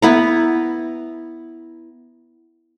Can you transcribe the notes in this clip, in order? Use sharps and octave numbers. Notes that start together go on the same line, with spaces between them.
B3 E4 A#5